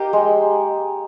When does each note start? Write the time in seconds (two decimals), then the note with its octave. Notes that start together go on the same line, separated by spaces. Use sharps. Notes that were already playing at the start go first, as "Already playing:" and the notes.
Already playing: A#3 D#4 G4
0.13 G#3